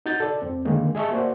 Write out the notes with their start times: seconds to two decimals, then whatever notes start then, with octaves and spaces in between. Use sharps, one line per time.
0.06 D#4 F#4 G6 A6
0.20 A4 D5
0.42 F2 C4
0.65 D3 D#3 G#3 A#3 D#4
0.95 G#4 D#5 E5 A5 C#6
1.10 A#3 F#4 C5 D5